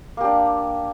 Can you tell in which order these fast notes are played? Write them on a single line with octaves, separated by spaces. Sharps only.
A#3 G4 D4